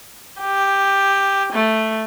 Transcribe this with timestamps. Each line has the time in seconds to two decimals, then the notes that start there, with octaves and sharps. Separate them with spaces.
0.41 G4
1.53 A3